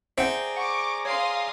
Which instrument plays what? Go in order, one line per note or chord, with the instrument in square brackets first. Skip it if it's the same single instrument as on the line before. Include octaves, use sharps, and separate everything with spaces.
[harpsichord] C4 [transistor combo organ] G#4 D5 A#5 [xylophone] E5 F#5 G6
[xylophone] F#5 [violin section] C#6 D6
[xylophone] C#5 [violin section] F5 C6 D#6